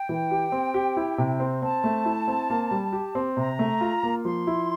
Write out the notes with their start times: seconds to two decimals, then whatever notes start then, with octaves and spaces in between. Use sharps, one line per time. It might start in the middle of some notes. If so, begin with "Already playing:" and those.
Already playing: G5
0.09 E3
0.31 G4
0.52 C4
0.74 G4
0.97 E4
1.18 C3
1.40 C4
1.62 C4 A5
1.84 A3
2.05 E4
2.28 C4
2.50 A#3
2.71 G3
2.93 G4
3.15 C4
3.37 C3 A#5
3.59 A3
3.81 F4
4.03 A#3
4.24 F3 C6
4.47 E4